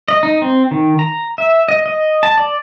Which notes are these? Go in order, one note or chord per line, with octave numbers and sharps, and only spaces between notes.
D#5
D#4
C4
D#3
A#5
E5
D#5
D#5
A5
D5